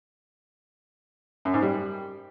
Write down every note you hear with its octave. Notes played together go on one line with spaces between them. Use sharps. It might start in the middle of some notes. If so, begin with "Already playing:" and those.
F#2
G#2
G3